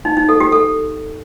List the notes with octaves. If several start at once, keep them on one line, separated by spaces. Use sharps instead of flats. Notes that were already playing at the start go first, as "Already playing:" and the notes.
D#4
D#4
A4
G4
A4